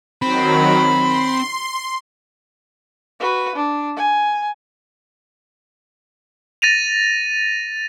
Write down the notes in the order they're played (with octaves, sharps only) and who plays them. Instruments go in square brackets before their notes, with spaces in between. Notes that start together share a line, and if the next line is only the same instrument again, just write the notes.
[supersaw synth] D#3 F#3 [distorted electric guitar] C4 [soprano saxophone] B5
[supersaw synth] C6
[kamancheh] F#4 B4
D4
G#5
[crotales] A6 A#6 D#7 F7